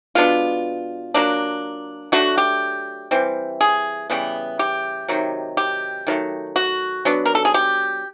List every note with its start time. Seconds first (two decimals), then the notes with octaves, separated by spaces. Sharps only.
0.15 B2 G#3 B3 D4 F4
1.14 F#3 A#3 D4
2.12 F#3 A3 D4 F#4
2.38 G4
3.11 E3 G3 C4
3.61 G#4
4.10 C#3 E3 G3 B3
4.59 G4
5.08 C3 D#3 F#3
5.57 G4
6.07 D#3 F#3 A3
6.56 F#4
7.05 F#3 B3 D4
7.26 A#4
7.35 A4
7.45 G#4
7.54 G4